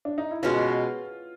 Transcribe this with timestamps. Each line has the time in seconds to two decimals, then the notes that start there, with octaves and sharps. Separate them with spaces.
0.05 D4
0.18 D#4
0.31 E4
0.43 B2 G#3 C#4 F4 F#4